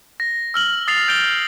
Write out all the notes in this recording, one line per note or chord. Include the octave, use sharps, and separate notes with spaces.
A#6
E6 F6 F#7
D#6 A6 C7 F7
G6 D7 F7 G7